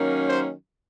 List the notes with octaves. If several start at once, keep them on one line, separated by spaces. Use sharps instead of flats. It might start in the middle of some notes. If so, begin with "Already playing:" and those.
Already playing: D#3 F#3 A#3 C#4
C5